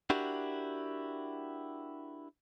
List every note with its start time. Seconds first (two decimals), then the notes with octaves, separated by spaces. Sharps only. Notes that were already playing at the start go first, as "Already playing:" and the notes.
0.10 D4 E4 F#4 G4 A#4